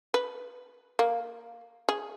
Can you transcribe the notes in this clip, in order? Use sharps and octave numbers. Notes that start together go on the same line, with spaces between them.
B4
A#3
G#4